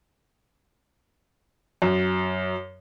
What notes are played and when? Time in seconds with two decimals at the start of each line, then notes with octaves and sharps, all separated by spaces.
1.82 F#2